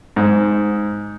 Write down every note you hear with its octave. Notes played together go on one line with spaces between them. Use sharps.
G#2